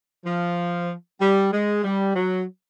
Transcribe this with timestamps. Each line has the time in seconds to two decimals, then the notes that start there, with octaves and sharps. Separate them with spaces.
0.24 F3
1.20 G3
1.52 G#3
1.84 G3
2.15 F#3